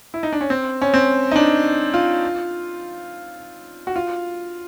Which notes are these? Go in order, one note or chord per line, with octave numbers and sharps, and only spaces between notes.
E4
D#4
D4
C#4
C4
C#4
C4
D#4
D4
F4
F#4
F4